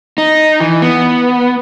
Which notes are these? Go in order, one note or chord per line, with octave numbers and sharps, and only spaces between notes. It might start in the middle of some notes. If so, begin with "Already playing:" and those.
D#4
E3
B3